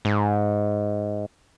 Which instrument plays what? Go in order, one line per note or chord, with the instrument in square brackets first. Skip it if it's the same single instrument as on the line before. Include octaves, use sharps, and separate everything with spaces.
[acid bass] G#2